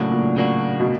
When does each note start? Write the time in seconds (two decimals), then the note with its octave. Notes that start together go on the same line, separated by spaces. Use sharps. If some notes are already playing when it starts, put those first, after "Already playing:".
Already playing: A2 C#3 F#3 A#3 D4 F#4
0.10 A#2
0.36 C#3 F#3 A#3 D4 F#4
0.80 B2